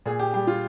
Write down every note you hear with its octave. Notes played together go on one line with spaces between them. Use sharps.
A#2 G#4
G4
G3 G4
F4